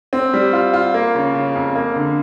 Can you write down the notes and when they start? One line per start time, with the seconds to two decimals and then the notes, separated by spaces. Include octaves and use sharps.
0.13 C4
0.34 G3
0.53 F4
0.74 F4
0.94 A#3
1.15 C#3
1.35 C#3
1.56 F2
1.75 A#3
1.96 D3